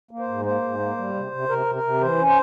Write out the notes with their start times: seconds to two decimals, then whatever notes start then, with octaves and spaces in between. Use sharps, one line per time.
0.11 A#3
0.19 C5
0.28 G#2
0.45 A#3 C5
0.62 G#2
0.80 A#3
0.97 G3
1.14 C3
1.31 C3
1.49 C3 A#4
1.66 C3
1.75 A#4
1.83 C3
2.01 E3 C5
2.18 C#4
2.27 C5